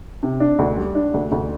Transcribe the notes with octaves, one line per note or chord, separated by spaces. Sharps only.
C3
D4
D2
G3
D4
D2
D2